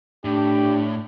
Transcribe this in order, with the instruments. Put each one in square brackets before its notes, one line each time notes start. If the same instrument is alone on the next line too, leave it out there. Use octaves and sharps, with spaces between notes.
[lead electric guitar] A2 [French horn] D4 [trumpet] G4